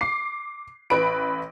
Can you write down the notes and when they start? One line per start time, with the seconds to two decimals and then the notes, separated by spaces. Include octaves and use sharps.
0.01 D6 C7
0.90 A1 B4 B5 D7